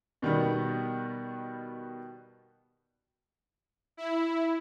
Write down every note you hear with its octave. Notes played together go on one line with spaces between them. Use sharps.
B2 D#3 G3 B3
E4